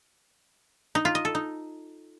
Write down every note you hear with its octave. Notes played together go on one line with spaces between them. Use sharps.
D#4
F4
D#5
A4
D#4